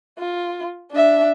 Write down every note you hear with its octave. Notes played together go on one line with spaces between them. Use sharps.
F4
D4 E5